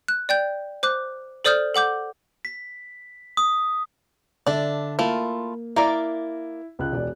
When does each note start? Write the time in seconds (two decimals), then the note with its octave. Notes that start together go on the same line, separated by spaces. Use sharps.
0.08 F#6
0.29 D5 G5 G6
0.83 C5 D6 F#6
1.44 A4 C5 D5 D#6 F6 G6
1.75 A4 F#5 D6 G6
2.45 B6
3.37 D#6
4.46 D3 D4 D5 E5
4.99 A3 A#3 E4 F4
5.76 A#3 E4 A#4 D5
6.79 C#2 F#6
6.92 E1 D5